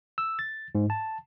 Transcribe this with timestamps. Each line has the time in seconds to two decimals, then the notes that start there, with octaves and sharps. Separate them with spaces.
0.18 E6
0.39 A6
0.75 G#2
0.90 A5